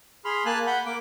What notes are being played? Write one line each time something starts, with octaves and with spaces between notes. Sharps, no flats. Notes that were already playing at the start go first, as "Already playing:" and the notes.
G#4 B5 C6 F6
A#3 G#5 A5 F#6
F#5 B5 G6
A#3 D6